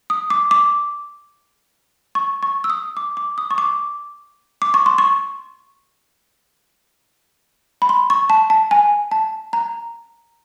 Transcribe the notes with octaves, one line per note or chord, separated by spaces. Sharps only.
D#6
D6
D6
C#6
C#6
E6
D#6
D6
D6
D#6
C#6
D6
D6
C#6
C6
C#6
B5
C6
C#6
A5
A5
G#5
A5
A#5